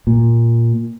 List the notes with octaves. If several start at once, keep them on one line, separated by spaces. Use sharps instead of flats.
A#2